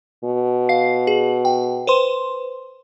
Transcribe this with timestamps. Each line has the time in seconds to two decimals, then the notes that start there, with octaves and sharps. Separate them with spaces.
0.24 B2
0.69 F5 C7
1.07 G#4
1.45 G5
1.87 B4 C5 C6